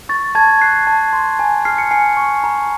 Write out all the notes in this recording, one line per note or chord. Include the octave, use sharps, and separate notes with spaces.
C#6 A6
A5 G#6
F#6 C7
A5
C6
G#5
F6 C7
C#7
G#5 C7
C#6
A#5